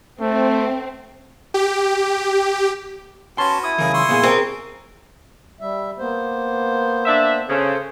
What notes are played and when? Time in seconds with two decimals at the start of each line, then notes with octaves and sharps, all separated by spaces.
0.21 A3 C4
1.54 G4
3.38 C#4 F#4 B4 A5 C6
3.64 E4 D#6
3.78 C#3 E3 G#4 A#4
3.94 C6 C#6 E6
4.09 A#2 B3 G#4
4.23 C4 G#4 A#4
5.60 G3 E5
5.99 A#3 B3 C5
7.06 D4 E5
7.49 C#3 A4 C5